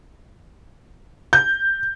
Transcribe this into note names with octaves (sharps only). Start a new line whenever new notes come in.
G6